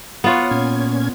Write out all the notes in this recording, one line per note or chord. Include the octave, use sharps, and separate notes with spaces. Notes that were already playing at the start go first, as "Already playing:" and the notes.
B3 F4 C#5 F#5
A#2 C#4 G#6